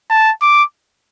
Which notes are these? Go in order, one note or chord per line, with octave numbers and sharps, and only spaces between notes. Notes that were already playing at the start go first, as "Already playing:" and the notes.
A5
D6